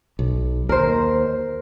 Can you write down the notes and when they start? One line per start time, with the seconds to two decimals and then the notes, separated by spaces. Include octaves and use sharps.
0.19 B1
0.69 D#2 A#4 C5